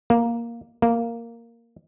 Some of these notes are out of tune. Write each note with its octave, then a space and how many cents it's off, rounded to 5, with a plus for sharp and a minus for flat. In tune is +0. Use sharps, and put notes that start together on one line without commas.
A#3 +5
A#3 -5